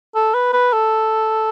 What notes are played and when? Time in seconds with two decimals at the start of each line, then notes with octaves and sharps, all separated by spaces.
0.15 A4
0.34 B4
0.53 B4
0.73 A4